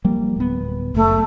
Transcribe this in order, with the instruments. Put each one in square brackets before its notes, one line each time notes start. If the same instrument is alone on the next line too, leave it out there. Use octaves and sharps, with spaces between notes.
[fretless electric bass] F3 G3 A#3
D1 B3
[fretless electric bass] F#1 [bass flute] A3